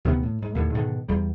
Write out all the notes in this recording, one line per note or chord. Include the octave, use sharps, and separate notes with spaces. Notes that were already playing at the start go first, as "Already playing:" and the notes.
D2 C3 D#3 B3
A2
G#2
D#2 A2 D3
G#2 B2 D3 D#3
E2 G3